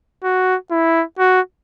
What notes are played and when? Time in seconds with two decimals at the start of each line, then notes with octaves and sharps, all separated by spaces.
0.24 F#4
0.71 E4
1.19 F#4